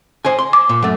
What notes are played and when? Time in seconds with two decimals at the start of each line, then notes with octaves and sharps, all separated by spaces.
0.25 C5 D#5 G#5
0.39 C6
0.53 D6
0.69 A#2
0.82 F#2 A3